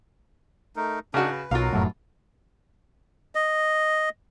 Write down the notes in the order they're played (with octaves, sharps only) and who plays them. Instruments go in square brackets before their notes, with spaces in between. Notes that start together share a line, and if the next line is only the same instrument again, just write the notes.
[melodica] A3 D#4 A#4
[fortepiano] C#3 F#4 [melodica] D4 D#4 A#4
[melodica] B4
[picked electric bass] B1 [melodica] F#3 F#4 A#4 [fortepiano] F4 F5
[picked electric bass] F1 F#2 A2
[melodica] D#5